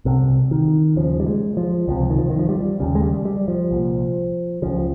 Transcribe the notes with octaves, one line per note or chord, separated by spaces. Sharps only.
C2 C3
D#3
D#2 C#3 F3
G3
G#3
F3
C#2 C3 F3
D#3
F3
D#3
F3
G3
D#2 C#3 G3
G#3
G3
G3
F3
C2 A#2
C#2 C#3 F3